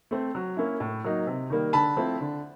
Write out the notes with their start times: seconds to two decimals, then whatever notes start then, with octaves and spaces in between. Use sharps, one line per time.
0.11 A3 C4
0.35 F#3
0.57 A#3 C#4 E4
0.80 A2
1.04 F#3 A#3 D#4
1.27 C3
1.50 D#3 G3 A#3
1.73 D3 A5 B5
1.97 F3 A3 C4 E4
2.20 D3